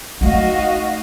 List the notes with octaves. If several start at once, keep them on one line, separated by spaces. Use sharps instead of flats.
A3 D#4 F#4 D#5 F5